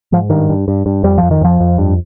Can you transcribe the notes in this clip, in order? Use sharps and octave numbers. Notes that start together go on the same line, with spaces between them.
G#2 F3
G2 D#3
G2
G2
G2
F2 G3
F2 F3
D#3
F2 F3
F2
G2